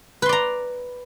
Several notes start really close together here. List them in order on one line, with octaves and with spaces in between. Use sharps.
B4 C6 D5 A#5